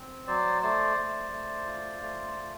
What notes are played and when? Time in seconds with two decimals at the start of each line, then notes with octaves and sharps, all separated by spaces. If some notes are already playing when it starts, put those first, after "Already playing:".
Already playing: C4
0.27 F#3 C5 D5
0.62 A3 C5 D5
0.97 A3
1.32 A3
1.67 F4
2.01 A3
2.37 F4